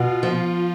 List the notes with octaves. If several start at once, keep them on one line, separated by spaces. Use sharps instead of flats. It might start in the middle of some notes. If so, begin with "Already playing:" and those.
Already playing: B2 F4
F3